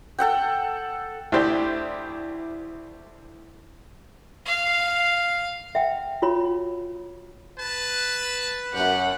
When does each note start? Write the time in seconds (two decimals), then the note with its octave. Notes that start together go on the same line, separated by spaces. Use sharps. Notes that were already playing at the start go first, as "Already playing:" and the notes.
0.18 A4 F#5 G5
1.32 D2 E4 G4 C5 D5
4.46 F5
5.75 E5 F#5 G5
6.22 F4 F#4 C#5 B5
7.59 B4 A5
8.74 F#2 G4 F#5